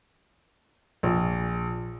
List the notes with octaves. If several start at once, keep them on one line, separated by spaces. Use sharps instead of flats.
A#1